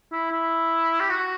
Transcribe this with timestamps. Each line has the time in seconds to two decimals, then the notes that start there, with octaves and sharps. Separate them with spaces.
0.12 E4
0.31 E4
1.01 G4
1.10 F#4